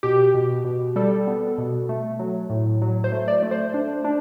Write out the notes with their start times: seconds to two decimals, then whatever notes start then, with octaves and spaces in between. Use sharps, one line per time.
0.03 B2 G4
0.34 B2
0.65 B2
0.96 G3 A4
1.27 B3
1.58 B2
1.89 A3
2.19 F#3
2.50 A2
2.82 F#3
3.04 C5
3.12 A3
3.28 D5
3.43 A3
3.51 C5
3.74 D4
4.04 D4